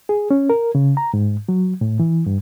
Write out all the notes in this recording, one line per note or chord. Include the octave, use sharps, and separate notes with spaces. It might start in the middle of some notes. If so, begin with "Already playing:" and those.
G#4
C#4
A#4
C#3
A#5
G#2
F#3
A2
E3
G2